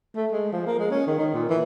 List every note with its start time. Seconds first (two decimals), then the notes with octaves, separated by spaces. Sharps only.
0.15 A3
0.32 G#3
0.52 F3
0.67 A#3
0.79 G#3
0.91 C#4
1.07 D#3
1.19 D#3
1.33 A#2
1.49 E3